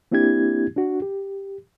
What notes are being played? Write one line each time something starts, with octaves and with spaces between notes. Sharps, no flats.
A#3 C4 D4 E4 G4 G#6
D4 F#4
G4